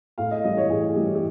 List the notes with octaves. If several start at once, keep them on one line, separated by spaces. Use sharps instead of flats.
A2 F5
D#5
E3 G3 D#5
C#5
A2 G#4
E3 G3 G4
G4